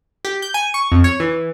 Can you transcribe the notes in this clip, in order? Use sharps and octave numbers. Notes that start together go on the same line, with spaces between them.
G4
G6
G#5
C#6
F2
C#5
E3